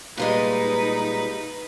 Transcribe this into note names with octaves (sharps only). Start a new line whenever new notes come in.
A#2 G3 G#3 D#4 B4